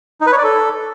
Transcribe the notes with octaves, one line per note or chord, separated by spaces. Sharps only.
D#4
B4
C#5
D5
A4